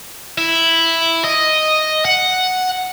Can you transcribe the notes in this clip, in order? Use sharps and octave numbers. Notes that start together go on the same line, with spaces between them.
E4
D#5
F#5